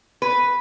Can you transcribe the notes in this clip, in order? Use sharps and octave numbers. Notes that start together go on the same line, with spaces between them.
B4